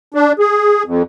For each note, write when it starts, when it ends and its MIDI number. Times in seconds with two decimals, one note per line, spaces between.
0.14 0.32 62
0.39 0.83 68
0.86 1.03 41